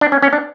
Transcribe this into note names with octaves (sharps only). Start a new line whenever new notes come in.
D4
C#4
C#4
D4